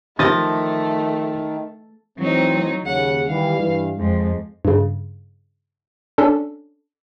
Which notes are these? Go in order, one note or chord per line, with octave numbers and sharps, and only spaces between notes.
D#3 F3 A3 D#5 A6 A#6
E3 F#3 A3 C4 D#4
D#2 C#3 F#5
D#3 E3 G3 F5
G2 E3
F2 G#3
G2 C#3
C#4 D4 A4